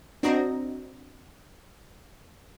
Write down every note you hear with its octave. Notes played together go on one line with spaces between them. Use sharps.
C4 D4 F#4 D#5 A#5